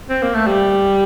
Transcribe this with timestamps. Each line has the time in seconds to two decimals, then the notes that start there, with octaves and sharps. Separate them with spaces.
0.09 C4
0.22 A#3
0.34 A3
0.47 G3